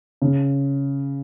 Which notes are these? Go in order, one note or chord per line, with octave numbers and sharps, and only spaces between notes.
C#3